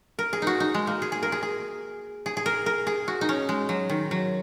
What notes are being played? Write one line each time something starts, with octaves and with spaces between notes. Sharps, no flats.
A#4
G#4
D#4 F#4
D#4
G#3
A#3
G#4
G#4
A#4
G#4
G#4
G#4
G#4
A#4
A#4
G#4
F#4
D#4
C#4
G#3
F#3
D#3
F#3